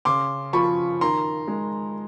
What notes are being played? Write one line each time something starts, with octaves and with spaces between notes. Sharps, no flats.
C#3 C6 D6
F3 B5 C#6
D#3 A#5 C6
G#3